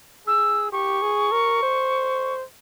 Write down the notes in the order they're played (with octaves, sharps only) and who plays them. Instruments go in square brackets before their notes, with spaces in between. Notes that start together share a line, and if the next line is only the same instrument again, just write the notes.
[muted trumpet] G#4 [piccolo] E6
[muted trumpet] G4 [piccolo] C#6
[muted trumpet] G#4
A#4
C5